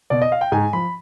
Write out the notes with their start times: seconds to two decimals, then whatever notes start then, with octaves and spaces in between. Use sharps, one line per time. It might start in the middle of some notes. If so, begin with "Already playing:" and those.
0.10 B2 D5
0.22 D#5
0.32 F5
0.41 G5
0.52 G#2 G#5
0.73 F3 B5